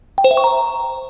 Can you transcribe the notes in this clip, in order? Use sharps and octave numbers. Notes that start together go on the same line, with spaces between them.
G5
C5
E5
C#6
A#5